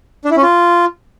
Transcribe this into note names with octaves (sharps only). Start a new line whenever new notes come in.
D4
E4
C#4
F4